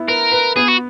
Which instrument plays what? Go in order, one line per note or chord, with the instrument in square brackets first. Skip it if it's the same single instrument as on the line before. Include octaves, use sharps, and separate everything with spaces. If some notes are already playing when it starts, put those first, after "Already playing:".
Already playing: [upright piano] B3 E4
[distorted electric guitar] A#4 [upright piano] B4
[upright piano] B4
[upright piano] B3 [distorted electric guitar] G#4
[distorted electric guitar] F#4